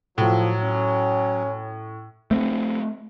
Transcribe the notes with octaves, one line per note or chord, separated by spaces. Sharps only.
A2 F3 F#3
C#4
A3 C4